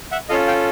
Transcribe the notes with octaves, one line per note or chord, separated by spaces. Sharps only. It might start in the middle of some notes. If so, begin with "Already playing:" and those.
E5 F#5
C#4 F4 A4 D#5 F5
F5 G5